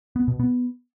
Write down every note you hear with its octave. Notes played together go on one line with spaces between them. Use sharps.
B3
B2
B3